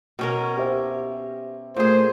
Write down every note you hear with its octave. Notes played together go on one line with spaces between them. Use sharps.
B2 C#4 A#4
G4 C5 E5
A#2 A3 G#4 C5